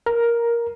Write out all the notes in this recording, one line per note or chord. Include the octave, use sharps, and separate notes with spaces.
A#4